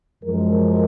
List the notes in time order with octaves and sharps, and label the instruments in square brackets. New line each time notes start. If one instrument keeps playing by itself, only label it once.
[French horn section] F#2 F3 G#3 A#4